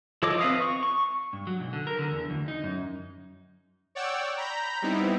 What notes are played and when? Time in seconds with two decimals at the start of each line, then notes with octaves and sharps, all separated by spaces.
0.23 F3 A4 C#5 D#5 D6
0.40 C4 B4 E5 F5 D#6
0.60 C#6
0.83 C#6
1.33 G2
1.47 F#3
1.60 B1
1.73 D3
1.87 A#4
1.99 D3
2.12 E2
2.30 D2
2.48 D#4
2.64 F#2
3.95 C#5 D5 F#5 G5 E6
4.37 A#5 B5 G6
4.82 G3 B3 C4 D#4 E4